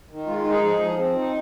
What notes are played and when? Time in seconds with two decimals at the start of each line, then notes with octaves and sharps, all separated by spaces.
0.09 D#3
0.26 G#3 F4
0.38 F4
0.44 D#4
0.50 G#4
0.62 F3 G#4
0.80 F3
0.98 C4
1.16 D#4